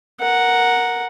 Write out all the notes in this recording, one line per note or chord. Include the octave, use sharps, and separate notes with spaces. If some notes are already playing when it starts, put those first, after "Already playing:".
A#4 F#5